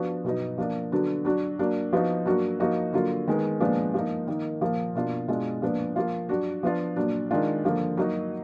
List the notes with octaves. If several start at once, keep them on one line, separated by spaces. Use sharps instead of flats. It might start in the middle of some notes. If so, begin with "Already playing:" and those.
Already playing: F3 B3 D4 F#4
B2 F#3 B3 D#4
F3 A#3 D4
D3 F#3 B3 D4 F#4
F#3 D4 F#4
F#3 A#3 D4
F3 B3 D#4 F#4
F#3 A#3 D4 F#4
F3 A#3 D#4 F#4
D3 F#3 A#3 F4
D#3 G#3 B3
A#2 F3 G#3 B3 D4
F3 A#3 D#4
D#3 A#3 D#4
A#2 F3 A#3
B2 A#3 D4 F4
B2 G#3 D4 F4
A#2 F3 B3 D4
F3 A#3 F4
F#3 D4 F#4
F3 B3 D4 F4
A#2 F#3 D4
D#3 G#3 D4 F4
D3 F3 A#3
F#3 A#3 D#4 F#4